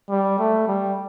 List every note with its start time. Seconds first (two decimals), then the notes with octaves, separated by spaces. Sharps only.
0.10 G3
0.39 A3
0.68 G3